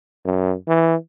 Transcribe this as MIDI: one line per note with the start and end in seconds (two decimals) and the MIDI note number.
0.25 0.55 42
0.67 0.95 52